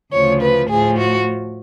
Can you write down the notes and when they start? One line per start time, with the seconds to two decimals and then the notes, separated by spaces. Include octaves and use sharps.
0.12 D2 C#3 F3 C#5
0.41 B4
0.69 A2 F3 G#4
0.97 F#4